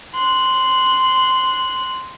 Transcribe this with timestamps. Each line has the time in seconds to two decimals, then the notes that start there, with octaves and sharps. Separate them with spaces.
0.13 C6 F#6